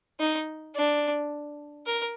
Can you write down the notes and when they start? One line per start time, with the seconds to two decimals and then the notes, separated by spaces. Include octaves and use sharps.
0.20 D#4
0.76 D4
1.86 A#4